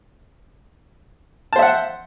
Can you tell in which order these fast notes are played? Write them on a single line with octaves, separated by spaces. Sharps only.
A5 C5 E5 F#5